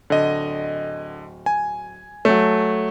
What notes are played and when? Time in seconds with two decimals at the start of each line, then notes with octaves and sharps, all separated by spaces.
0.10 D1 D3 D#5
1.46 G#5
2.25 F#3 A3